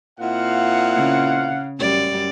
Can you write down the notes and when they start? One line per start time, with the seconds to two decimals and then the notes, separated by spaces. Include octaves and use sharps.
0.20 A#2 C4 E4 F5 F#5
0.95 C#3
1.78 F#2 G3 D5